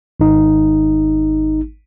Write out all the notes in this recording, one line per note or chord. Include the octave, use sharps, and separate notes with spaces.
G#1 D#4